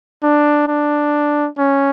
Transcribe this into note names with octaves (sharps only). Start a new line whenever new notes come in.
D4
D4
C#4